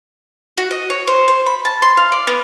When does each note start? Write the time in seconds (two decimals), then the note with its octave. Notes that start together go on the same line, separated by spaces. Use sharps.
0.57 F#4
0.71 D#5
0.90 C#5
1.07 C5
1.28 C5
1.46 B5
1.65 A5
1.82 C6
1.97 F5
2.12 D5
2.27 B3